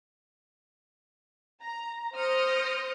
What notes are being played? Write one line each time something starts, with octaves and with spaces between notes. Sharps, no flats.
A#5
C5 D#6 F6 G6 A#6 C#7